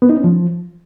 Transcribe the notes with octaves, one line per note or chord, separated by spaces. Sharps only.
B3
D#4
C#4
F3